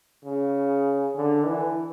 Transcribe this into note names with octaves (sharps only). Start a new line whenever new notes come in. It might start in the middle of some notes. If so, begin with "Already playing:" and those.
C#3
D3
E3